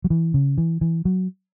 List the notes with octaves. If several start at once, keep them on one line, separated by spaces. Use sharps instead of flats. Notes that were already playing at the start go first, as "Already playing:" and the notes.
F#3
E3
C#3
E3
E3
F#3